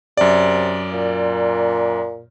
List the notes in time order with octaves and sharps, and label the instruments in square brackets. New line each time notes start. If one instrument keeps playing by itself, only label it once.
[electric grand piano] F#2 D5 [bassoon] C3
[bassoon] A#2